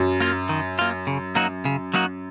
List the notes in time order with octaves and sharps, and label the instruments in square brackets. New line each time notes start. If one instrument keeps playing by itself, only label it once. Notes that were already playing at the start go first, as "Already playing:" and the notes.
Already playing: [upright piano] F#2
[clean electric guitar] A#3 F4
D#3
A#3 F4
C#3
F#3 A#3 D#4 F#4
C#3
F#3 A#3 D#4 F#4